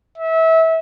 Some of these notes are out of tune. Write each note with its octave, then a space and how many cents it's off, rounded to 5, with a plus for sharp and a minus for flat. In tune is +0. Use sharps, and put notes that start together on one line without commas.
E5 -25